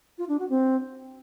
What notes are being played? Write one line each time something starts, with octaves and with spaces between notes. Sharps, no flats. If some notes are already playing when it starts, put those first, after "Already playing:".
F4
D4
F#4
C4